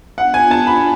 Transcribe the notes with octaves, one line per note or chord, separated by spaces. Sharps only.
B3 D4 F4 F#5
G#5
A5
B5